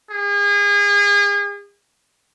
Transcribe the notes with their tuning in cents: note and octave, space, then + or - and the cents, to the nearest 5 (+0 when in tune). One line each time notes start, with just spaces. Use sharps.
G#4 -35